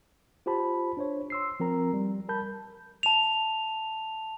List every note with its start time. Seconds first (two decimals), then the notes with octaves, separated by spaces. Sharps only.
0.46 F4 G4 C5 A5 B5
0.97 D4 C5 C#5
1.30 C6 E6 C7
1.60 F3 C4 A#4 A#5
1.93 G3
2.29 A#4 A5 B5 G6
3.03 A5 F7